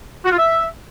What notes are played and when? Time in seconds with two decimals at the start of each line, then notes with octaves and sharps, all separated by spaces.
0.25 F#4
0.31 F4
0.38 E5